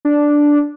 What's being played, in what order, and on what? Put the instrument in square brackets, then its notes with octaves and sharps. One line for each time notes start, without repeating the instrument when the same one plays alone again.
[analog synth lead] D4